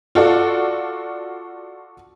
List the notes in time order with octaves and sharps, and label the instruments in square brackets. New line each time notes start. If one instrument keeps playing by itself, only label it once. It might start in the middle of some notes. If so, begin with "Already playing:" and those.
[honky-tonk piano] F4 F#4 A4 D5